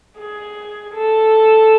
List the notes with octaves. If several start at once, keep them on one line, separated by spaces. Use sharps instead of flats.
G#4
A4